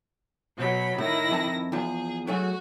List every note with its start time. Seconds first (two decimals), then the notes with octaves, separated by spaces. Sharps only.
0.57 B2 F#3 B5
0.98 A2 D#3 E4 A#6
1.30 F2 A5
1.72 E2 F3 G#4
2.27 F#3 A3 F#4 G#4